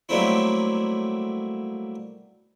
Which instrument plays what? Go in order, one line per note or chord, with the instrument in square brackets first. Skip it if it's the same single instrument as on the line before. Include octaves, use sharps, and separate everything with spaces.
[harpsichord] F#3 G3 A3 A#3 C4 E4